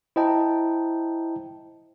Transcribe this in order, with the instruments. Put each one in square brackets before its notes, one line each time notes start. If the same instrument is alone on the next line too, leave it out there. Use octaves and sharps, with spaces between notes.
[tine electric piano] E4 C5 D#5 G5 A5 A#5